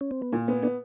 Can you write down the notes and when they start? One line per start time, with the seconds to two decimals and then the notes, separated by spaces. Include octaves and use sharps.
0.01 C#4
0.11 C4
0.22 B3
0.33 A#2 A#3
0.48 B3 C4
0.63 B3 D4